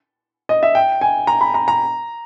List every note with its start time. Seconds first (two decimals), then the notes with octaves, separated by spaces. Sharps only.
0.49 D#5
0.63 E5
0.75 G5
1.01 G#5
1.27 A#5
1.41 B5
1.54 A#5
1.68 A#5